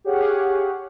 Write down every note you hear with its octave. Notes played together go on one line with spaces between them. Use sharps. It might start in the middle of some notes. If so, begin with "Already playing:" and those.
G4 G#4 C#5 F5 F#5